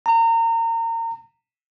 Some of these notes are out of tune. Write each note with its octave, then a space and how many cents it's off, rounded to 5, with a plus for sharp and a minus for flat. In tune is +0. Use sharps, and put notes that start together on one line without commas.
A#5 -30